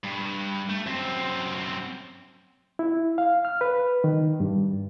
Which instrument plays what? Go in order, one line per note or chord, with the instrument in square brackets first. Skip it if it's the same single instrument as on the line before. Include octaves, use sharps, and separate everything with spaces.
[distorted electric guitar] G2
A3
F#2 C4
[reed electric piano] E4
F5
F6
B4
D#3
G2